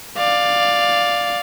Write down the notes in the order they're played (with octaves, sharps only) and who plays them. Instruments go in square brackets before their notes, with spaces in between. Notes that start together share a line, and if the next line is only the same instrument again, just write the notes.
[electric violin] D5 F5